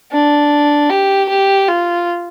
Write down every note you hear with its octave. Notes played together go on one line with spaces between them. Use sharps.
D4
G4
G4
F4